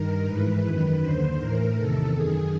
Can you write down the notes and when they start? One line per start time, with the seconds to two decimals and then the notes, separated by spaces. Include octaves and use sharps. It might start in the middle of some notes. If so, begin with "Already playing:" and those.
Already playing: G2 D#3 A#4
0.26 G#2 E3 B4
0.64 F#2 D#3 B4
1.02 D#2 D3 C5
1.39 A2 E3 A#4
1.76 E2 C3 D#3 A4
2.15 F#2 D#3 G#4